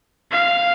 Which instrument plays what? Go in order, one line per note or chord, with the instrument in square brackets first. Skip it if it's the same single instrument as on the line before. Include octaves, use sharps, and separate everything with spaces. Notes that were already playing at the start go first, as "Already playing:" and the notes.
[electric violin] F5